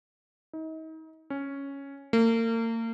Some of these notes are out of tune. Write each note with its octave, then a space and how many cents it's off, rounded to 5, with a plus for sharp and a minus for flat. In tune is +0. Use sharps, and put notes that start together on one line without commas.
D#4 +35
C#4 +0
A#3 -40